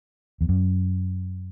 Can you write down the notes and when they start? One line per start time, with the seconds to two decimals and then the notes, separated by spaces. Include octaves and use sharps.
0.41 E2
0.49 F#2